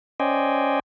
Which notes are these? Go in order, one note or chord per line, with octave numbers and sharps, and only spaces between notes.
C#4 C5 D5 D#5 G5 G#5